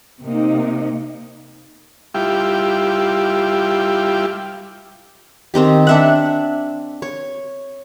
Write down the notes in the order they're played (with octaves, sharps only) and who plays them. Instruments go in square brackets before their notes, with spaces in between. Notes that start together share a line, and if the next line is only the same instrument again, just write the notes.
[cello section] C3 A#3 D#4
[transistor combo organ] G3 E4 F4 G4
[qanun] D#3 C4 D#4 G4
D4 E5 F#5
C#5